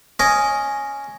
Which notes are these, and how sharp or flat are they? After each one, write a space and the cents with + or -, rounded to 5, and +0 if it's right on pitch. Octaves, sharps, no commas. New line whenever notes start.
C#4 +0 D#5 +0 D6 -30